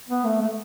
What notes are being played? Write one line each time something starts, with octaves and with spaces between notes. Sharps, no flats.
B3
A3
A3